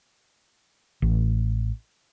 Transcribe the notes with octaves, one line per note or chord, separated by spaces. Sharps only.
A1